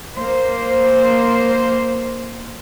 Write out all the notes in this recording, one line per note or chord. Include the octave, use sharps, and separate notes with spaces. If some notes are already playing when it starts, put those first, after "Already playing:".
A#3 C5